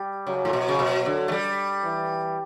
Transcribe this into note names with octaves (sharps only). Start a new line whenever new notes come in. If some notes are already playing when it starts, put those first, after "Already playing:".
Already playing: G3
C#3 F#3
A2
B2
C#3
B2
D3
A3
G3
E3